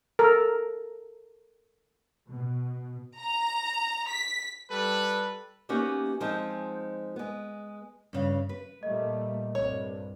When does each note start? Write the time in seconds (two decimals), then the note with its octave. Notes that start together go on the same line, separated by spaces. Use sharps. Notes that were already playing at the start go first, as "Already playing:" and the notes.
0.19 A4 A#4
2.30 B2
3.20 A#5
4.10 B6
4.70 G3 A4 B4
5.69 A#3 B3 C#4 D#4 F#4 G4
6.20 F3 G#3 C4 D#4 F4
7.16 G#3 B3
8.13 G2 C#3 F5
8.49 B4
8.83 A#2 G3 A3 D#5
9.55 C2 G2 C#5